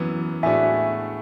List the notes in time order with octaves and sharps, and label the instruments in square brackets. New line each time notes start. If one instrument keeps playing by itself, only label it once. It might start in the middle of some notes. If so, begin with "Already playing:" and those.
Already playing: [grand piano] F#2 E3 B3
[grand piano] A2 G#3 B3 D4 F#4 [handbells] E5 G#5